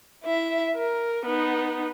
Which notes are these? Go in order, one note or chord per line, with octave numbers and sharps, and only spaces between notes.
E4 E5
A#4
B3 D#4